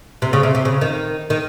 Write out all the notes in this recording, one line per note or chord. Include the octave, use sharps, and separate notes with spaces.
C3
C#3
C3
C3
C#3
D#3
D#3